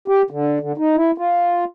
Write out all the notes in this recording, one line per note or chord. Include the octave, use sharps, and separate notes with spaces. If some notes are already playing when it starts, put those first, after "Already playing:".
G4
D3
D3
D#4
E4
F4